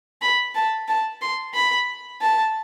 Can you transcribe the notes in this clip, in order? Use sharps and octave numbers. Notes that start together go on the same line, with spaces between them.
B5
A5
A5
C6
B5
A5